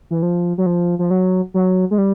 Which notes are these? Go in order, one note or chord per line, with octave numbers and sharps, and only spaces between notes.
E3
F3
F#3
F3
F3
F#3
F#3
G#3
G3